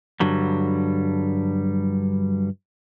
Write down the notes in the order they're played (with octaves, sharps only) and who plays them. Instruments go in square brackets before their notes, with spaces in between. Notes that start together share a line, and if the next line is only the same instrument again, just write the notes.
[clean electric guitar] G2 D3 F#3 G3